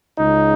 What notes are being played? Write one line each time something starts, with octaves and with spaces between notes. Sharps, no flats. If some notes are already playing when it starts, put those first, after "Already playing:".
C#2 C#3 D#4